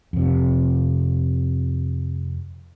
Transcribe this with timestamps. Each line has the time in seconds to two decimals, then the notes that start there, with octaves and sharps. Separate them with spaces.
0.13 F2 C3